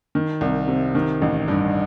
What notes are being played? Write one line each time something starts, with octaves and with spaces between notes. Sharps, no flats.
D#3
C2
C3
D#3
A1
G2